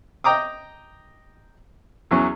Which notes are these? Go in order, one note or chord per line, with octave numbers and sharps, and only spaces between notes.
D#5 G5 A#5 D6 D#6
E2 F#3 C#4